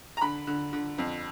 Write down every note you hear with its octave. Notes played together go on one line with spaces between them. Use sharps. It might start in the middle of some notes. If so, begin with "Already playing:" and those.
A#5
D3 B5
D3
D3
F2